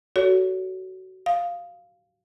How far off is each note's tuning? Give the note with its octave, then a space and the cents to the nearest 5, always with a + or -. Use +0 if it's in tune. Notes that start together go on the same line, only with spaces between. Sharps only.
F#4 +25 A4 +0 C#5 +30
F5 +0 D#6 +0